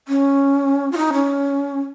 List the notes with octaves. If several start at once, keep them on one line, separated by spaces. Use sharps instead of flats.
C#4
F4
D#4
C#4